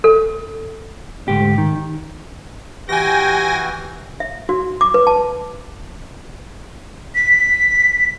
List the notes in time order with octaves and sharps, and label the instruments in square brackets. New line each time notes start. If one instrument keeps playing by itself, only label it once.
[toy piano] A4
[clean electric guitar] D2 G#2 G4
D#3
[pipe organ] E3 F#4 [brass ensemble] G4 [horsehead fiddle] G5 [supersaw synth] G#5 A#6
[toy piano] E5
F#4
D6
B4
A5
[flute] B6